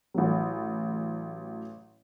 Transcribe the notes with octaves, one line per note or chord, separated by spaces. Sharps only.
A1 F#3